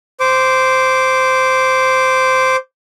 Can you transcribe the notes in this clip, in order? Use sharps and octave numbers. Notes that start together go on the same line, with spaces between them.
C5 D6